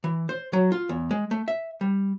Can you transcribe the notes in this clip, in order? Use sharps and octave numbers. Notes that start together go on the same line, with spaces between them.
E3
C5
F#3
F4
E2
G#3
A3
E5
G3